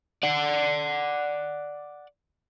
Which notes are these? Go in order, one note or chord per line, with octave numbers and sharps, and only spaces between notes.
D5 F#5